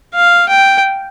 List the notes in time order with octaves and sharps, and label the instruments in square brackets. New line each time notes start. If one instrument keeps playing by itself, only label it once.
[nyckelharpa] F5
G5